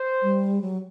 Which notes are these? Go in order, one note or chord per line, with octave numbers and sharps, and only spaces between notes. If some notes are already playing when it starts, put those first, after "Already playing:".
Already playing: C5
G3
F#3